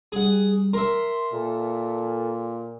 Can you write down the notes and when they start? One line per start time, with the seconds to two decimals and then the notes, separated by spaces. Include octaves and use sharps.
0.12 G3 G#4 F#5
0.73 A#4 E5 C6
1.33 A#2 A4